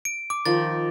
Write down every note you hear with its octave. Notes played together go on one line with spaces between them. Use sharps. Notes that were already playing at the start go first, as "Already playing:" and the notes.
D7
D6
D#3 F3 A6